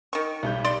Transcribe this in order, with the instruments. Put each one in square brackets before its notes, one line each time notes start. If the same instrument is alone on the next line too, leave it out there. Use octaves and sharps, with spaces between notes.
[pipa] D#3 C#6
[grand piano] B1 G3 G6
[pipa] D5 C6